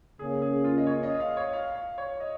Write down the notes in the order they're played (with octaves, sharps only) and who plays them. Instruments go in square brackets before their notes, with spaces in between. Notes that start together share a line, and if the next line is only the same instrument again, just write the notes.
[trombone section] C#3 A#3 C#4 [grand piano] G#4
[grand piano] G#4
F4
D#5
C#5
D#5
F5
C#5
F5
F5
C#5
D#5